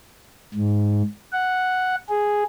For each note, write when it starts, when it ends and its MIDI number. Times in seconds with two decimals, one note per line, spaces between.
0.54 1.03 44
1.33 1.96 78
2.09 2.43 68